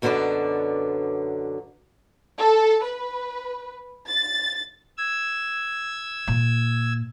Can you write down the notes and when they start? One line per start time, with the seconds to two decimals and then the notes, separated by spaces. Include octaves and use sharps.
0.02 F#2 B2 D3 F#3 B4 D5
2.39 A4
2.84 B4
4.08 A6
4.98 E6 G#6
6.27 A#2